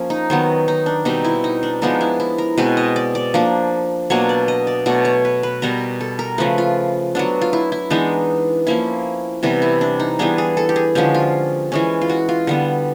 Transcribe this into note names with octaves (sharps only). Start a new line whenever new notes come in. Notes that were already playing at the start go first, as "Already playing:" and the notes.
Already playing: F3 A#3 C#4
D#4
D#3 F#3 B3
D#4
D4
B2 G3 C4 D#4
E4
D#4
D4
F3 G#3 B3 D4 D#4
E4
E4
A#4
B2 G#3 C4 B4
D#5
D5
D5
F3 A#3 D4
B2 F#3 A#3 D4 C#5
D5
D#5
D5
B2 F#3 A3 D5
C#5
B4
B4
B2 G3 B3 A#4
A4
A#4
C#3 F3 A3 B4
F4
F#3 B3 D4
F4
E4
E4
E3 G#3 B3 D4 D#4
F3 A#3 C#4 E4
C3 E3 G3 B3
E4
D4
D#4
E3 G3 B3 D4 G#4
G#4
A4
G4
G#4
D3 F3 G#3 C#4 G4
F4
E3 G#3 C#4
F4
F#4
F4
D3 G3 B3